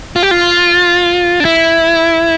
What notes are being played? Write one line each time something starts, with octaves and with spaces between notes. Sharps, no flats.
F4
G4
F4
D4
E4